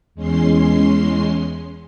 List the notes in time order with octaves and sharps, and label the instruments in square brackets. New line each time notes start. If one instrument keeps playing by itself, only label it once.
[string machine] E2 G#3 C#4 C6 C7